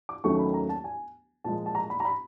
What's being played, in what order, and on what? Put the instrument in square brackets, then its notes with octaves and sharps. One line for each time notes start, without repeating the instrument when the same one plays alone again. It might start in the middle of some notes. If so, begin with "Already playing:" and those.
[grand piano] D6
D#2 D#3 F#3 A3 C#4 C#6
B5
A#5
A5
G#5
A#2 F3 G#3 A5
A5
A#5
B5
A#5
B5